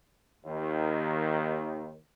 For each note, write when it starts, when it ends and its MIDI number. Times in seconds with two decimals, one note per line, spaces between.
0.46 1.95 39
0.46 1.95 51